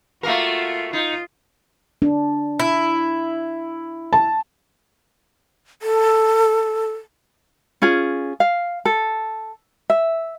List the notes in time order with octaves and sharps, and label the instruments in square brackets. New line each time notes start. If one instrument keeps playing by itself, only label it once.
[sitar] A3 A#3 A#4 [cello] F4 F#4
[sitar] D#4 [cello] F4
[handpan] D4
[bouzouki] E4
[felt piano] A5
[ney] A4
[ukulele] C#4 F4 G#4
F5
A4
E5